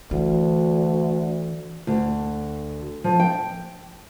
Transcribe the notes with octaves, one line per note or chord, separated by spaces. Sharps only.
D2 E3
D2
F3
G5